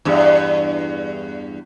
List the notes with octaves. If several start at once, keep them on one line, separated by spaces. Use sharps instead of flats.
E2 G2